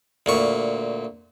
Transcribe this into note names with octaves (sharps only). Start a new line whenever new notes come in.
D2 A#2 C#6